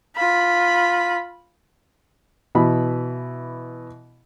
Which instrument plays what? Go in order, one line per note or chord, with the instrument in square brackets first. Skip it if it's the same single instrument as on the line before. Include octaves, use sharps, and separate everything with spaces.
[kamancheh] F4 B5
[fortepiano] B2 E3 B5